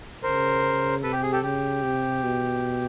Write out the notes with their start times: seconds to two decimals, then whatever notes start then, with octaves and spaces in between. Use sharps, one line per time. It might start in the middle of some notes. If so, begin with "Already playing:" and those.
0.23 C#3 A#4 C5
1.03 C3 A4 B4
1.13 G4
1.22 G#4
1.32 G4 A4
1.43 C#3 G4
1.83 C3
2.23 B2